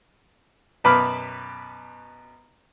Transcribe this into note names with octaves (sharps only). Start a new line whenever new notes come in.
F#2 B2 B4 B5 D6 F6